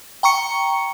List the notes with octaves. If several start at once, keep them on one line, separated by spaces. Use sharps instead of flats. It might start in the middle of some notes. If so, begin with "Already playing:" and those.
G5 A#5 C#6 C#7